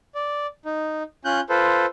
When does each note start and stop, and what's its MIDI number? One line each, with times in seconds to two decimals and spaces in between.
0.15 0.47 74
0.65 1.03 63
1.25 1.40 61
1.25 1.40 65
1.25 1.40 90
1.25 1.40 91
1.49 1.86 65
1.49 1.86 69
1.49 1.86 71
1.49 1.86 72